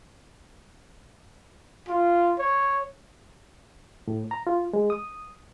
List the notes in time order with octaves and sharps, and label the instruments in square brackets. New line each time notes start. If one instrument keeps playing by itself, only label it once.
[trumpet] F4
C#5
[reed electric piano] A2
A#5
F4
G#3
D#6